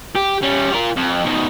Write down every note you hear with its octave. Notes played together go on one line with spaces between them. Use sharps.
G4
G3 C#4
F4 A#4
F2
B2 D#3